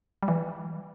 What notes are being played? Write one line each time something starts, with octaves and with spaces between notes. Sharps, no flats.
G3
E3